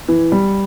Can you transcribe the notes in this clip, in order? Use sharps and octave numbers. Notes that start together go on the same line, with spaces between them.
E3
G3